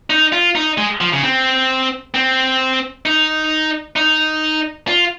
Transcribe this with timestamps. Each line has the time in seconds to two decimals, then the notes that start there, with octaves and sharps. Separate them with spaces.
0.10 D#4
0.33 F4
0.55 D#4
0.78 G#3
1.01 F3
1.13 C#3
1.23 C4
2.14 C4
3.06 D#4
3.96 D#4
4.88 F4